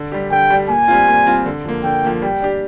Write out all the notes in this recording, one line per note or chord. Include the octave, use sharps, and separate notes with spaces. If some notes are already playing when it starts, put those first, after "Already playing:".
Already playing: D3
G3 D4 G4
D3 G5
G3 D4 G4
A#2 G#5
G3 C4 F4
A#2
G3 C4 F4
D3
F3 A#3
D3 G5
F3 A#3
G3 G5
D4 G4